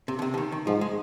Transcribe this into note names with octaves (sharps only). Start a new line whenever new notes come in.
C3
D3
C3
D3
D#3
D#3
G#2 F3
G#3